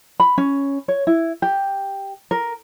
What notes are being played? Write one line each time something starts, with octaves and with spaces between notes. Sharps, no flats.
B5
C#4
C#5
E4
G4
A#4